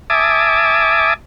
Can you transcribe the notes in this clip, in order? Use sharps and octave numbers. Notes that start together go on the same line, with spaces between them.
E5 G#5 A5 D6 D#6